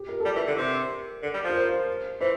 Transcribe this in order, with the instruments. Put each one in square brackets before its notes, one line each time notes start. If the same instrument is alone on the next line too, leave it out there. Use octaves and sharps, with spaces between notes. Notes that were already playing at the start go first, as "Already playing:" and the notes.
Already playing: [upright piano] G4
A#4
A4
[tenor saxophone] G3 [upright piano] A#4
[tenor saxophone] E3
D3
C3
D3
G3
F3
[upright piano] A#4
C5
[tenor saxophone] E3 [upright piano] C5